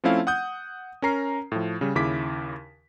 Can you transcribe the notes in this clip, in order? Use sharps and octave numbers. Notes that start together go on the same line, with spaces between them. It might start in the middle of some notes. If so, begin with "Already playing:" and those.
F3 A3 C4 C#4 E4 F5
F#5 D#6 G6
C#4 A#4 A#5 C7
A2 F3
C#3 G3
D#2 C#3 E4 D6 B6